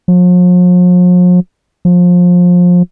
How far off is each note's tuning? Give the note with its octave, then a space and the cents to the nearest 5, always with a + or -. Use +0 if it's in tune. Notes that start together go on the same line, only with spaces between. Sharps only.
F3 +45
F3 +25